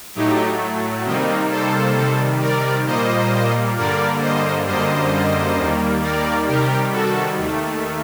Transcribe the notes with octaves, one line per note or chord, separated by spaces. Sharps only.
A2 F#3 A3 D#4 G4
C3 D#3 G3 A#3 C4 D#4
A4 C5
C3 D#3 G3
A#4 D5
A#2 G3 A#3 C5 D#5
G2 D3 G3 A#3 A#4 D5
C5 D#5
F#2 D3 G3 A#3 C5 D#5
D#2 D#3 G3 A#3
A#4 D5
C3 D#3 G3 G4 A#4
F#4 A4
D#2 D#3 A3